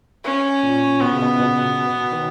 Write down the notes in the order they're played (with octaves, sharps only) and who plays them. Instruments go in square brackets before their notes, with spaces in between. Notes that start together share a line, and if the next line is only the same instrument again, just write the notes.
[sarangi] C#4
[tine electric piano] A#2
[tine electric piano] B2 [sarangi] B3
[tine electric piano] C#3
B2
B2
B2
B2
D#3